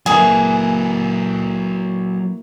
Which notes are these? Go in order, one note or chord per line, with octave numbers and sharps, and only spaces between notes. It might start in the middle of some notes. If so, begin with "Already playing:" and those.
F#3 A#3 E4 G#4 A4 B4